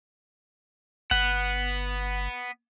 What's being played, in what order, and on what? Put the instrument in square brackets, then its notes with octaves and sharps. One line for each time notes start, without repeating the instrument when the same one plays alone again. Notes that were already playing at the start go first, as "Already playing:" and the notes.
[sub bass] G1 [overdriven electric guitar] B3 [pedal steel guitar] F#5